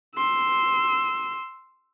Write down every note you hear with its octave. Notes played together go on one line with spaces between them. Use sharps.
C6 E6